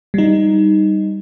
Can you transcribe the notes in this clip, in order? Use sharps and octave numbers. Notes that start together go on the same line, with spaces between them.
G3 D#4